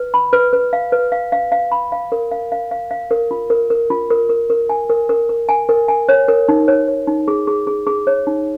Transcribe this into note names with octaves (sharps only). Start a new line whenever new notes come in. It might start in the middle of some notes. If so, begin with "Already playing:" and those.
Already playing: B4
B5
B4
B4
F5
B4
F5
F5
F5
B5
F5
A#4
F5
F5
F5
F5
A#4
F4
A#4
A#4
F4
A#4
A#4
A#4
G#5
A#4
A#4
A#4
G#5
A#4
G#5
C#5
A#4
D#4
C#5
C#5
D#4
G#4
G#4
G#4
G#4
C#5
D#4